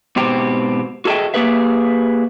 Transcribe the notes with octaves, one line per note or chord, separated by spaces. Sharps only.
G#2 B2 C4 G4
F#4 G#4 A4 D#5 E5 G5
A#3 G4 G#4 B4 E5